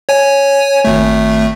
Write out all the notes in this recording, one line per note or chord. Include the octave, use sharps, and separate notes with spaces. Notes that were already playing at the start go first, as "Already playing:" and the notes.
C#5 G#5
G#1 A3